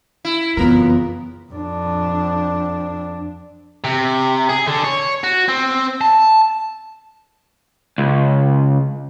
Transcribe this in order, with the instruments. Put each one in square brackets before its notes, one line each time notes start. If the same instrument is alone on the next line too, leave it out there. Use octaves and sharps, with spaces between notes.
[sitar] E4
[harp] F#1 F4 F6 [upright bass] F2 E3 [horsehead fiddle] B3 [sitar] A#4
[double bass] F2 D4
[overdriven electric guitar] C3
G#4
D3
C#5
F#4
C4
A5
C#2